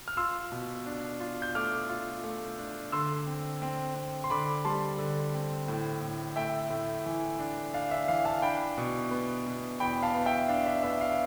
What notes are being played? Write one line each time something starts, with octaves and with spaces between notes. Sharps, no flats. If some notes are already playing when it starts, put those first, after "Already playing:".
F6
F4 C6 E6
B2
D4
F4
G6
A3 D6 F6
F4
A3
D4
D3 C6 E6
C4
C4
C4
C6
D3 B5 D6
G3 A5 C6
D3
C4
A2
A2
A3 E5 G5
A2
E3
D4
D4 F5
E5
E3 F5
F5 A5
D4 G5 B5
B2
B3
B2
E2 G5 B5
F5 A5
B3
E5 G5
D4 F5
E5
B3 E5
F5